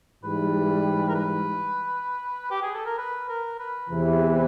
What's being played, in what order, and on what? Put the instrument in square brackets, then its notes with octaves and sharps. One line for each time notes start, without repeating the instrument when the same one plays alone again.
[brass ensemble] G#2 E3 G3 [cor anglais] B4
[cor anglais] A#4
B4
G4
G#4
A4
A#4
B4
A#4
B4
[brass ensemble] E2 C3 E3